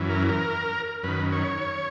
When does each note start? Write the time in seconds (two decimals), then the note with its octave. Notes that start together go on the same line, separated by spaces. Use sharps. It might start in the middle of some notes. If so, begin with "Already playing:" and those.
Already playing: F#2 E3
0.09 A#4
0.29 A#4
1.03 F#2 D#3 B4
1.32 C#5